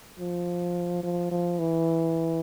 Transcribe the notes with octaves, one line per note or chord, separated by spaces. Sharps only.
F3
F3
F3
E3